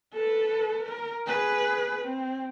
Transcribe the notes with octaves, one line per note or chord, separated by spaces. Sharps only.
A4 B4
A#4
G#4 B4
C4